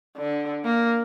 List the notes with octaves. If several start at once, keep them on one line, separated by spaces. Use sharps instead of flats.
D3
A#3